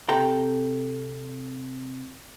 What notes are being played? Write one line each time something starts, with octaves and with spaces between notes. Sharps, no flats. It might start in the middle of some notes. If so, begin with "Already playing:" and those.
C3 A4 G5 A#5